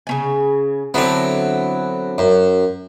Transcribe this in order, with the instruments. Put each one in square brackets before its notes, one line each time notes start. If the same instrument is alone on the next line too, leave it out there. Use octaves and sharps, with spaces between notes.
[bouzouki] C#3 C#4 G#5
[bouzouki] D3 F#3 E4 [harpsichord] B3 C4
[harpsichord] F#2